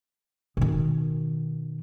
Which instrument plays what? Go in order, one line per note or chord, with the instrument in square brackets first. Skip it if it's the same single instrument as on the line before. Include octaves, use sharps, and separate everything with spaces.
[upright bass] B2 D#3